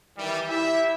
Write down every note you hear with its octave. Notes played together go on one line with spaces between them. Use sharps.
D#3 E3 G3
E4 G4 E5